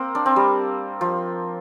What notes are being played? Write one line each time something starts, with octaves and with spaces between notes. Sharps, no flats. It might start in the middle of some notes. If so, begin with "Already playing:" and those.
Already playing: A#3 C4
D4
C4
G3
F3